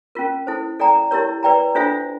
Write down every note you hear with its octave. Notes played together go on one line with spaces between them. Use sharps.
C#4 F4 A#4
E4 A4 C5
A4 D5 G5 A#5
E4 G4 A#4 C#5
B4 D5 G5 A#5
D4 F4 A4 C5 E5